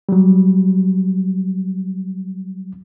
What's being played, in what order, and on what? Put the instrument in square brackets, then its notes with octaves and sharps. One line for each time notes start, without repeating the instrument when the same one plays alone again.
[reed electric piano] F#3 G3